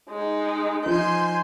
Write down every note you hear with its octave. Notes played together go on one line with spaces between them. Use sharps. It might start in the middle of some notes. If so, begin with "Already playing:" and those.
G#3 D#4
F3 D#4 G#5 C6 G6